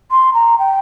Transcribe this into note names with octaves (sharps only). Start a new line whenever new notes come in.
C6
A#5
G5